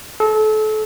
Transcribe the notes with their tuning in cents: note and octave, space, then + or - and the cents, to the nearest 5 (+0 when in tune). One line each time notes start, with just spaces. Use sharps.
A4 -30